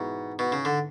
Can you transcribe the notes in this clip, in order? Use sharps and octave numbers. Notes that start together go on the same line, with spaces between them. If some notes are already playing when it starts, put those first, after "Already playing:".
Already playing: G#2 B2 E3 B3
B2
C#3
D3